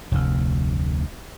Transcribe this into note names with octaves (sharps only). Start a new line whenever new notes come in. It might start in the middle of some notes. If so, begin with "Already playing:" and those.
F1 D2